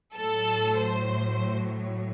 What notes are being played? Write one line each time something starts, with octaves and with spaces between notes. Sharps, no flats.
A2 F#3 A4
C5